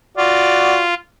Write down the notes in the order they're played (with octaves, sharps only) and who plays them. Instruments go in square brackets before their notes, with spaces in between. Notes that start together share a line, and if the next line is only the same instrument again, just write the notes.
[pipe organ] F4 [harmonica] F#4 D5